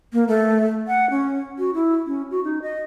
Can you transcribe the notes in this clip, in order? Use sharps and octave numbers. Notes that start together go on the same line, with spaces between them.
A#3
A3
F#5
C#4
F#4
E4
C#4
F#4
D#4
D#5